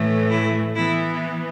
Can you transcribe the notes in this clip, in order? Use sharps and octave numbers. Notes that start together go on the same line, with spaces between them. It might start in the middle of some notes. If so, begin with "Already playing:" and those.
Already playing: A2 E3 A3
E4
E3 B3 E4